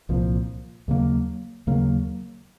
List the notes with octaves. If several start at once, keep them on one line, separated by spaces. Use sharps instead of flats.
C2 A#2 F3
D#2 C#3 F#3 A#3
D#2 C#3 F#3 A#3